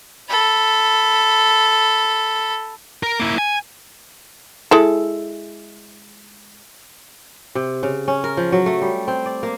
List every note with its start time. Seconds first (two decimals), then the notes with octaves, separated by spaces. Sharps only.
0.29 A4 B5
3.03 A#4
3.20 A#3 E4
3.38 G#5
4.71 G#3 E4 A4
7.55 C3
7.83 C#3
8.08 C#4
8.24 A#4
8.37 F3
8.52 F#3
8.66 A3
8.82 G3
9.08 C4
9.26 D5
9.43 A#3